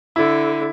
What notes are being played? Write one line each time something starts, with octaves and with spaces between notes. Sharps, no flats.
D3 E4